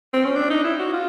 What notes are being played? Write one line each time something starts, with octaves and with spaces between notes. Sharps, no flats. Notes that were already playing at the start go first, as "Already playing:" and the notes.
C4
C#4
D4
D#4
E4
F#4
F4